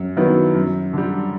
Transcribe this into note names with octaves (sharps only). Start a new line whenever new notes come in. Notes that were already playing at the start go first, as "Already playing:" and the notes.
Already playing: F#2
D#3 F#3 B3 E4
F#2
D3 G3